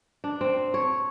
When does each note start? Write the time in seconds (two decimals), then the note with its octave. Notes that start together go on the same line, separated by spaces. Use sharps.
0.24 D4
0.41 C4
0.74 C#5